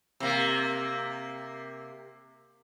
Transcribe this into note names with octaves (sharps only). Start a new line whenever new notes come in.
C3 A#3